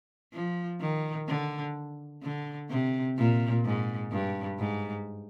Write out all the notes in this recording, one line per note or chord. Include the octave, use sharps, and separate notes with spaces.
F3
D#3
D3
D3
C3
A#2
G#2
G2
G#2